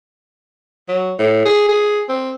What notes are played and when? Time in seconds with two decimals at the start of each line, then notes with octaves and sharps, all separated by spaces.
0.89 F#3
1.19 A2
1.46 G#4
1.69 G#4
2.09 C4